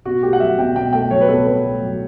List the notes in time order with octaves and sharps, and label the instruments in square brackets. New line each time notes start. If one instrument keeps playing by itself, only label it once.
[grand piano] B2 F#4
A3 G4
F#5
F#3 E5
B2 G5
B2 G5
A3 G5
F#3 C#5
B4
B2 A4
B2 B4
A3
F#3